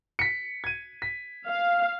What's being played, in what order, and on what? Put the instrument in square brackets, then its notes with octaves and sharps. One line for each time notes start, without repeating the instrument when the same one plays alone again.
[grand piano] B6 C#7
G#6 D#7
B6
[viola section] F5